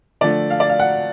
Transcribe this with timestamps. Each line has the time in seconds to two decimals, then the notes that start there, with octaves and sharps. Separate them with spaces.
0.21 D3 F3 A3 D5
0.50 F5
0.60 D5
0.70 F5
0.80 F#5